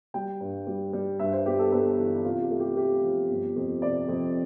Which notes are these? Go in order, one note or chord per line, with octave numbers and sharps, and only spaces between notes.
G3 G5
G2
G3
G3
G2 E5
C5
G1 G4
A4
G1 A4
E3
C3 F4
G4
A3
G4
A3 G4
F3
G1
F2
C3 D5
F2